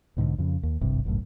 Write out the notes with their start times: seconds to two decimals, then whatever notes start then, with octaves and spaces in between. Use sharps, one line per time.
0.17 B1 G#2 B2 D3
0.38 F2 C#3
0.63 D#2
0.81 D1 G#1 G2 C3
1.05 G1 C#2 F#2 A2